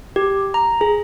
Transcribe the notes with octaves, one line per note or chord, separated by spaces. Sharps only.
G4
A#5
G#4